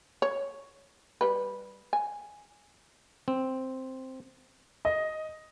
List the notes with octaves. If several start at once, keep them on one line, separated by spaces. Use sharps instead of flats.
C#5
G3 B4
G#5
C4
D#5